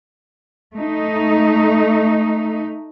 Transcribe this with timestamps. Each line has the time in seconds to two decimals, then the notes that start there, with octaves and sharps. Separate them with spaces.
0.74 A3 D#4